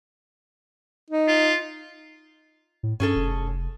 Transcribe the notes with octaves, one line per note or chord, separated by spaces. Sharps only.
D#4
F4
A2
G2 C#4 G#4 A4
F1